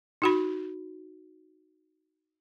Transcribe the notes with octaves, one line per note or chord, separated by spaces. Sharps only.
D#4 F#4 B5